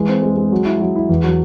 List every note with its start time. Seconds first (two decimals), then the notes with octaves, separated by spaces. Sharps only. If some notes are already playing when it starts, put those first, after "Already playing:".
Already playing: E3 G#3
0.09 C4
0.23 G#3
0.37 G#3
0.52 F#3
0.66 E4
0.80 F#3
0.96 E4
1.09 E2
1.24 F#3